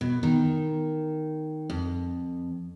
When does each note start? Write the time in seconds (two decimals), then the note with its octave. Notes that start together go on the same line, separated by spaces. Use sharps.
0.01 B2
0.23 D#3
1.70 F2